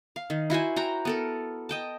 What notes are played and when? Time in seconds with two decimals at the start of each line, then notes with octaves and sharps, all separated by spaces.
0.16 F5
0.30 D#3
0.50 E4 F#4 C5 G#5
0.76 F#4 G5 A#5
1.05 B3 A4 A#4
1.69 D#5 G5 A5